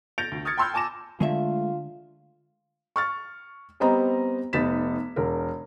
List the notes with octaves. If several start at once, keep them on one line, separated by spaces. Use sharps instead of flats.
G6 A6 A#6 D7 F7
D2
D#6 F6 G#6 A6 C#7
G5 B5 C6 E6 F6 G6
G#5 A5 D6 A#6 E7
D3 G#3 A3 F4 E5
C#6 F6 A6
G3 B3 C4 D#5 A#5
F1 B3 D#4 A6 B6 E7
E1 A#4